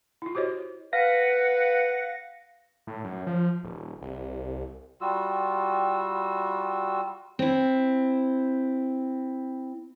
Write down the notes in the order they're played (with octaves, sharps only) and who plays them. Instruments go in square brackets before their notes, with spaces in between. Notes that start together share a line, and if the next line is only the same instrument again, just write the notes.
[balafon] E4 F4
F#4 G4 C5 C#5 D#5
[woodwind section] B4 F#5 [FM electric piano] F5 A#6
[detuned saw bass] A2
F#2
F3
D#1
C2
[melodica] G3 F4 F#4 E6
[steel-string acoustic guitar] C4 E4